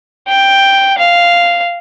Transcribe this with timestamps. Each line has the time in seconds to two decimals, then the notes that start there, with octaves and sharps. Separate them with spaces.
0.28 G5
0.98 F5